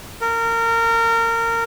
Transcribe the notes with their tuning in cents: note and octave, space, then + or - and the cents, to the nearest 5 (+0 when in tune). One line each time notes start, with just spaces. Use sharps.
A#4 -25